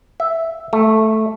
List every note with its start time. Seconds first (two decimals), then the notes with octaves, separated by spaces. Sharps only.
0.20 E5
0.73 A3